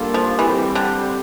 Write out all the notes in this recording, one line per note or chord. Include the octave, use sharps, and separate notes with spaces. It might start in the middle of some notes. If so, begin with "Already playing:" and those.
Already playing: G3 A#3 D4 F4 A4
F3
E3 G3 C4 G4
D3